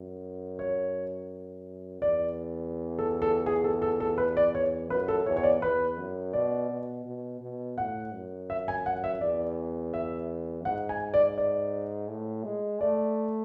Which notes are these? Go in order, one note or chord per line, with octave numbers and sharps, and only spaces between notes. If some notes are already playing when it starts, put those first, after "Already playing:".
Already playing: F#2
C#5
E2 D5
A4
A4
G#4
A4
A4
A4
B4
D5
C#5
F#2 B4
A4
E2 C#5
C#5
D5
E2 B4
F#2
B2 D5
B2
B2
B2
A2 F#5
F#2
E5
G#5
F#5
E5
E2 D5
E5
G#2 F#5
G#5
D5
D5
A2
G#3
A3 D5